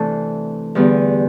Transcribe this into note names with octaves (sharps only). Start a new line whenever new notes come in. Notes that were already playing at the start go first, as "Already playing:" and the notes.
Already playing: C3 E3 A3 D4 A4
E2 D3 G3 B3